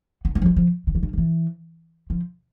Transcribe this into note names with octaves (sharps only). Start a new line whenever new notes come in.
B3
B3
F3
G#3
F3
D3
E3
D3
F3
E3
F3